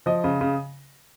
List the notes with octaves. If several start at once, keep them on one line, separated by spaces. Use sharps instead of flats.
F3 D#5
C#3
C#3